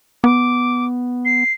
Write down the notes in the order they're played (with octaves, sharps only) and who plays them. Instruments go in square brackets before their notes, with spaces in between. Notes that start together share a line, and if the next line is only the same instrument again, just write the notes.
[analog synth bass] B3 [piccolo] D6
[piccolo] C7